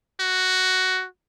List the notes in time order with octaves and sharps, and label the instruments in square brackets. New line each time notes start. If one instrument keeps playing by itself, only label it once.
[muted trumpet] F#4